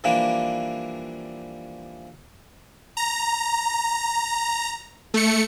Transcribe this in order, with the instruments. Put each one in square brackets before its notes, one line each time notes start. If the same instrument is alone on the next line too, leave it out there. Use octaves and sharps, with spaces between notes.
[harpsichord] E3 F3 G3 A#3 D4
[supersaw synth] A#5
A3 C#7